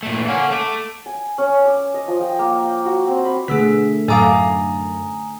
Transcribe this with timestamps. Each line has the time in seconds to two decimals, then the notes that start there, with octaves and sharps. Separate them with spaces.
0.03 A#2 A3
0.16 E3
0.28 A#3 C#4 A4 F#5
0.51 A3 A4 D6
1.06 G#5
1.38 C#4
1.65 D6
1.94 D#5
2.08 F3
2.21 G5
2.39 A#3
2.62 G5
2.85 F#4
3.08 C4
3.25 B5
3.48 B2 D3 A3 G#4 E6 B6
4.08 F#2 A2 F5 G#5 A#5 D6 D#6